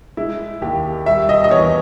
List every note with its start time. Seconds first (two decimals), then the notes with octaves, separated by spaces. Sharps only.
0.17 G#3 E4
0.61 D#2 G4
1.06 G3 E5
1.29 D#5
1.44 D#5
1.50 E2 C#5